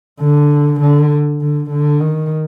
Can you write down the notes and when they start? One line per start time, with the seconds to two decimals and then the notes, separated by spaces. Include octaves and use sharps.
0.20 D3
0.80 D3
1.41 D3
1.70 D3
2.00 D#3